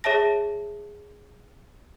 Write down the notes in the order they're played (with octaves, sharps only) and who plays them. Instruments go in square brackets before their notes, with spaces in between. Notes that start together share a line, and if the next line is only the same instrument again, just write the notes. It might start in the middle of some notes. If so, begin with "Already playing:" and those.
[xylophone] G#4 C#5 E5 A5 A#6